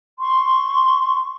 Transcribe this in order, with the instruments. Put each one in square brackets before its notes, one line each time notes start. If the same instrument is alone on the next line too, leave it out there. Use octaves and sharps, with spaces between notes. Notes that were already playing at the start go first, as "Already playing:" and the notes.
[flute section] C6 C#6